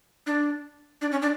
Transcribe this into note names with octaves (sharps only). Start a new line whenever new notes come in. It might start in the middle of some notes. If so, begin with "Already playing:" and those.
D4
D4
C#4
D4